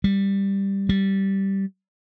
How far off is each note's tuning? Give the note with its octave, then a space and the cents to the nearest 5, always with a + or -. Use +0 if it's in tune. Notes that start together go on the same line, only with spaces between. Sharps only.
G3 +5
G3 -10